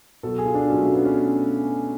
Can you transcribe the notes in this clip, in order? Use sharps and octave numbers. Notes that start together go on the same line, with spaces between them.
B2 F#3 A4
G#4
F4
D4
B2 F#3 C#4
A3
B3
C#4